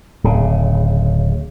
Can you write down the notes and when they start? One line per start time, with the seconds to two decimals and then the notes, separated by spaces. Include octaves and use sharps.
0.24 D1 C#3